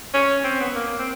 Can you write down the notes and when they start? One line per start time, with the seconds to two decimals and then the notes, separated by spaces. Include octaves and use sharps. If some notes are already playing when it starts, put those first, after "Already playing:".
0.14 C#4
0.44 C4
0.60 B3
0.75 A#3
0.99 C4